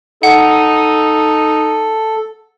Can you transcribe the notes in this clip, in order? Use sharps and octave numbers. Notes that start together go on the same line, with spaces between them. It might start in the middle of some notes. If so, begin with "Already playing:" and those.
D#4 A4 F#5